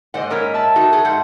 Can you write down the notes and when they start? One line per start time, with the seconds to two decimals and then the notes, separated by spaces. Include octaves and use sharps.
0.14 G#2 C5 D5 D#5 F#5
0.30 A#2 C#4 D#4 A#4 B4
0.54 E5 A5 B5
0.76 D#4 F#4 A4
0.93 G#4 A4
1.05 G#2 F#5 G6